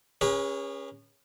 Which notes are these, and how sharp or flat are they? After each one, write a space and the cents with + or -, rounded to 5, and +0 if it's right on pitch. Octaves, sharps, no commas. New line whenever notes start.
C#4 +0 G#4 -35 B4 -40